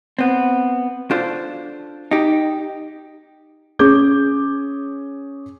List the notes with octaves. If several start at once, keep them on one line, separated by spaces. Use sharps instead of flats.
B3 C4
D4 F4 A4 C5
D#4 G4
C#4 G#4 D6 G6